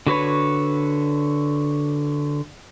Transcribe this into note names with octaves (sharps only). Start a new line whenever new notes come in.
D3 F#4 B4 C#5